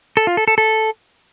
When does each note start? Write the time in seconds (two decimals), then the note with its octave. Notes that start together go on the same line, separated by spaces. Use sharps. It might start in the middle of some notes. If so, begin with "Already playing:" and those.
0.17 A4
0.27 F4
0.37 A4
0.48 A4
0.58 A4